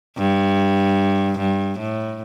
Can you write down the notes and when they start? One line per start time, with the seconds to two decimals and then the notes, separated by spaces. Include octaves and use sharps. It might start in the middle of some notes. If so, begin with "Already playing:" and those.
0.18 G2
1.38 G2
1.78 A2